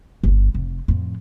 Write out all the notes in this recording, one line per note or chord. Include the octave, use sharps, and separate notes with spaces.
G1 E4
F1
F2 A2